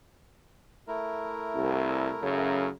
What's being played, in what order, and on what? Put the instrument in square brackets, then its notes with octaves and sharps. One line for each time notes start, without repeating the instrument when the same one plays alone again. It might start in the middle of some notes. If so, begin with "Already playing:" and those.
[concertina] A3 E4 A#4
[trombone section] C2
F#2 C#3